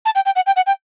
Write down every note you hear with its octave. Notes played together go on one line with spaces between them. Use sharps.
A5
G5
G5
F#5
G5
F#5
G5